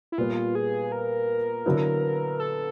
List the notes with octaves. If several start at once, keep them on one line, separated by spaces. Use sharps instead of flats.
E4
A#2 G3 B3 F4
G#4
A#4
D3 F#3 B3 E4
A4